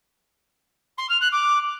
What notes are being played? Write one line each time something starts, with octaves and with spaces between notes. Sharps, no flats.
C6
F6
F#6
D6